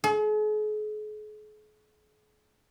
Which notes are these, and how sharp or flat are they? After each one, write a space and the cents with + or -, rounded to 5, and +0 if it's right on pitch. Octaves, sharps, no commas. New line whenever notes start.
G#4 +45